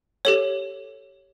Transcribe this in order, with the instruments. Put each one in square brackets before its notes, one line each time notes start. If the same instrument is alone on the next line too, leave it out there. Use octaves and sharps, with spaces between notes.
[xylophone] G4 A4 C#5